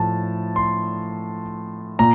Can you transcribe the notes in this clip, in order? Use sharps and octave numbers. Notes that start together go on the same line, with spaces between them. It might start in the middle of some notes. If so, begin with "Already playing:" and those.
Already playing: A2 F3 A5
C6
A#2 A#5